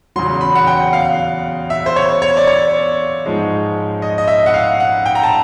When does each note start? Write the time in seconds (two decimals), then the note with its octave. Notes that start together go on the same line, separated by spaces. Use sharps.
0.16 E2 C#3 F#3 C6
0.41 B5
0.55 F#5
0.67 G5
0.93 F5
1.70 E5
1.86 C5
1.96 C#5
2.22 C#5
2.37 D5
2.47 C#5
3.26 G#2 F3 G#3
4.02 D#5
4.18 D#5
4.28 E5
4.46 F#5
4.54 F5
4.80 F#5
5.06 G5
5.15 A#5
5.23 A5